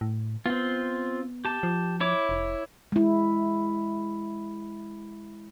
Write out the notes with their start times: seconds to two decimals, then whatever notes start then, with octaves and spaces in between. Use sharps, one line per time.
0.01 A2
0.46 B3 C4 F4
1.45 G4 A5
1.63 F3
2.01 E4 C#5 D6
2.29 F1
2.92 G#3 E4